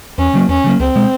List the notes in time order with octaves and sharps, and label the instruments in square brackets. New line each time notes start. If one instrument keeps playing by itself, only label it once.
[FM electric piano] E2 [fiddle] C#4
[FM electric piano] C#3 F#3 A#3
[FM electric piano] E2 [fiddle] C#4
[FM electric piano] C#3 F#3 A#3
[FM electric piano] C#2 [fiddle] C4
[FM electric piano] B2 G#3